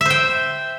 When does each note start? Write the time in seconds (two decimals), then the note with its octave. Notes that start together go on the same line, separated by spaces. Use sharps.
0.01 E5
0.06 C5
0.10 G5